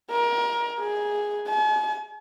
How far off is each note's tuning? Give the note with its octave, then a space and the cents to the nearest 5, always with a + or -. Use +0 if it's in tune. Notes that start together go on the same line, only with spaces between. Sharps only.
A#4 +25
G#4 +0
G#5 +45